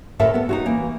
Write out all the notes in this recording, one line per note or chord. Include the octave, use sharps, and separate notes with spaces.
D2 A2 A4 A#4 E5 A5
B3 A4
D#4 F4 F#4
E3 A#3